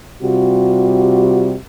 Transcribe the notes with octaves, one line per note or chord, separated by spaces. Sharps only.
C3 G3 F4 F#4